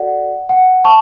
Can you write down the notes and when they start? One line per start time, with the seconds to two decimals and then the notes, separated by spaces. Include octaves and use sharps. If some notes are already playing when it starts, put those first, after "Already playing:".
Already playing: F#4 A4 D5 F#5
0.49 F#5
0.84 A5 C#6